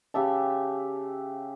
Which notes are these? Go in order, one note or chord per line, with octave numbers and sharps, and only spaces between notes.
C#3 G4 E5 A5